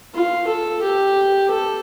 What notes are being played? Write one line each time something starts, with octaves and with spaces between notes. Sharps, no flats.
F4
A4
G4
A4